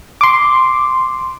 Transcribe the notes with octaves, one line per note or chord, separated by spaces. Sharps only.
C6 D6